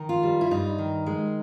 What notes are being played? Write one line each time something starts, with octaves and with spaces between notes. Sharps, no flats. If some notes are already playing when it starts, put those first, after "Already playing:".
Already playing: D#3
F4
G3
E4
G2 D#4
D#3
G#3